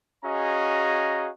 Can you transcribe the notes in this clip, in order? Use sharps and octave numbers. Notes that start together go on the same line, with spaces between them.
C#4 F#4 G#4 D#5 F5 A#5